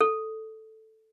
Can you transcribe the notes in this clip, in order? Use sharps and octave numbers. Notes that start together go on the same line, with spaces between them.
A4